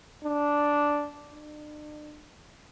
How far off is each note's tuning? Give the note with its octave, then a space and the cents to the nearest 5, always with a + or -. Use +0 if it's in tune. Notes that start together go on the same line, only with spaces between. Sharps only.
D4 -5
D4 +40